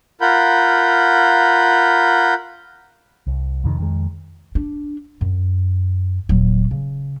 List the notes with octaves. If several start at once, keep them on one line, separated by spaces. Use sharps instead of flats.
F4 A#4 F#5 B5 G6
C2
F2 C3 D#3
F2 D#3 G#3
D4
F#2
D#1 F#3
C#3